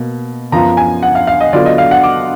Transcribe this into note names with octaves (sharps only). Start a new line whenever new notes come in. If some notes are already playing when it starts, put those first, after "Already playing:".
Already playing: B2 A#3
F#2 F3 B3 F4 A#5
G#5
F#5
F5
F5
D#5
D3 F#3 B3 F4 D5
D#5
F5
F#5
D6